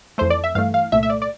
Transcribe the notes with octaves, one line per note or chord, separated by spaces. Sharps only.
F2 E3 A3 C5
D5
E5
G2 E3 A3 F5
F5
C2 A#2 A3 E5
E5
D5
D5